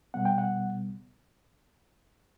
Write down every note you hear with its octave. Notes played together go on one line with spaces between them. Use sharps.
B2 G3 B3 F#5
G5
F#5